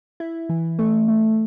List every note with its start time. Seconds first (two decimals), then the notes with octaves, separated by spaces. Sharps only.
0.20 E4
0.49 E3
0.79 A3
1.08 A3